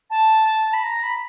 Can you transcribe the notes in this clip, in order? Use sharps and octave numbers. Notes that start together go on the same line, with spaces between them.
A5
B5
A#5
B5